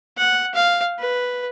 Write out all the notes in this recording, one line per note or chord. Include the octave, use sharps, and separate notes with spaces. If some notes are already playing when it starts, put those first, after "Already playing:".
F#5
F5
B4